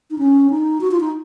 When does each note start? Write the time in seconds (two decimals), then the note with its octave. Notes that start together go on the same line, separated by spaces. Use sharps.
0.11 D#4
0.18 C#4
0.50 D#4
0.81 F#4
0.91 F4
1.00 D#4